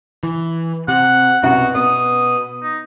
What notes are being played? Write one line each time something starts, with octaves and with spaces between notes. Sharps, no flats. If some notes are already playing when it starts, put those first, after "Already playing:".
E3
C3 F#5
C2 F#2 B2 F#4 F#5
B3 D#6
D#4